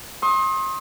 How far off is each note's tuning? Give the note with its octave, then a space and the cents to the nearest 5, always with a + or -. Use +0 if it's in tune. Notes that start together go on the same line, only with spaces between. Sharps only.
C6 +35 D#6 +25